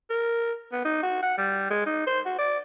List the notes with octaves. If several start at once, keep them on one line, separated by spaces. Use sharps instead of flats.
A#4
B3
D#4
F#4
F#5
G3
G#3
D#4
C5
F#4
D5